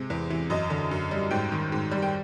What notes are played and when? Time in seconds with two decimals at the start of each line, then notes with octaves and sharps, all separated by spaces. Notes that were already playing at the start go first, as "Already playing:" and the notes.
Already playing: C3 G#3
0.10 E2
0.30 E3
0.50 F#2 D#5
0.70 D3
0.91 F#2
1.11 G3
1.31 G#2 G5
1.52 D#3
1.72 G#2
1.91 G3
2.02 G5